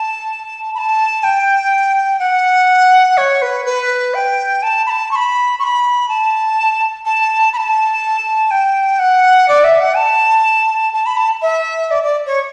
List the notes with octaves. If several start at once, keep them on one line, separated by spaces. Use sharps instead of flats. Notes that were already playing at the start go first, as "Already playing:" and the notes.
Already playing: A5
B5
A5
G5
F#5
C#5
B4
B4
G5
A5
B5
A5
C#6
B5
C#6
B5
A5
A5
B5
A5
G5
F#5
D5
E5
F#5
A5
A5
B5
A5
E5
D5
D5
C#5